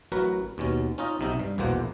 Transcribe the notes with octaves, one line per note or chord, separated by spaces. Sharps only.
A1 F#3 F#4 A#4 B4
D#2 B2 C#4
C#4 D#4 F4 D#5
B1 C3 D#4
G2
A#1 E2 B2 A#3 C5 F#5